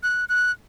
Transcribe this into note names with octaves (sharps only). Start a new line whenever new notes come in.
F#6
F#6